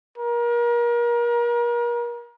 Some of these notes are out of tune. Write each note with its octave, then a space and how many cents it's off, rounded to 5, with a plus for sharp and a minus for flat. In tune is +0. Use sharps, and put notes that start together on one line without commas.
A#4 +35